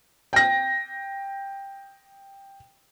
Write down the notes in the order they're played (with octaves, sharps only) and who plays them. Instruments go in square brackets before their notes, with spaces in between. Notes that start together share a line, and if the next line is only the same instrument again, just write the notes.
[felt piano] G5 A#6